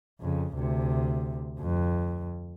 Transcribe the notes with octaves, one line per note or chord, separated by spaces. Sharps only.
F2 C#3
D2 C3
F2